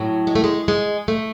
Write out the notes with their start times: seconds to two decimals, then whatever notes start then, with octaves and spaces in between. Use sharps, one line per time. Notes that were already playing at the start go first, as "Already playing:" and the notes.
Already playing: A2 F#3
0.27 G#3
0.35 A3
0.44 G#3
0.68 G#3
1.08 A3